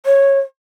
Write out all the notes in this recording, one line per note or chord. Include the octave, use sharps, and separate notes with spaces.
C#5